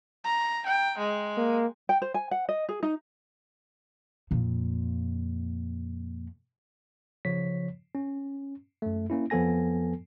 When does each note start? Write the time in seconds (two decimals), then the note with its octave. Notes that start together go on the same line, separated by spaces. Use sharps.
0.24 A#5
0.66 G5
0.98 G#3
1.37 A#3
1.89 G5
2.02 C5
2.14 G#5
2.31 F#5
2.49 D#5
2.69 G#4
2.83 D#4
4.31 F2 A#2
7.25 C#3 F3 C#5 B6
7.95 C#4
8.82 F#2 A3
9.10 A#3 C#4 E4
9.30 F2 F3 B3 A4 G#5 A#6